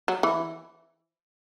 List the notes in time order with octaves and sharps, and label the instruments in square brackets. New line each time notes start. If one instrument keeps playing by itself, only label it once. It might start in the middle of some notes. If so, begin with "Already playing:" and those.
[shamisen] F#3
E3